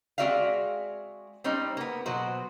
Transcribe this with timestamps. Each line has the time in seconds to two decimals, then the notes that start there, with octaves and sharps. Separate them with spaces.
0.18 G#3 C4 F#4 D5 E5 F5
1.44 G3 C4 C#4 D#4
1.77 A#3 B3
2.06 B2 F#3 F#4 C5